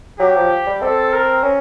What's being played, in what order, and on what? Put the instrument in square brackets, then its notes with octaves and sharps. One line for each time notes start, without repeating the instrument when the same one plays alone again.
[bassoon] F#3 [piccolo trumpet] G4
[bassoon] F3
G3
[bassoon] C4 [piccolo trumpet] A4
[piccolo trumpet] A#4
[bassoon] C#4